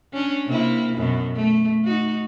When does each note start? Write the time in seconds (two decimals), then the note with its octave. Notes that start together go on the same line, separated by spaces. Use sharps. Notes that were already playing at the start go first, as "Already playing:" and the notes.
0.13 C#4 D4
0.46 C3 A#3 E4
0.97 F#2 B2 B3
1.36 A3
1.84 D#4 F#4